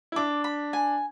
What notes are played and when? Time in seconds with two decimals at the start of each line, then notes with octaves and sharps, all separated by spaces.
0.12 E4
0.16 D4 D6
0.44 B5
0.73 G#5